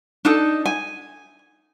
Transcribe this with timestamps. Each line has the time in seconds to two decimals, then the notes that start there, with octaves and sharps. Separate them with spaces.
0.25 D4 D#4 A4
0.65 G#5